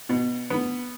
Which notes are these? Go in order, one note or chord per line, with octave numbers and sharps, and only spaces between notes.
B2
B3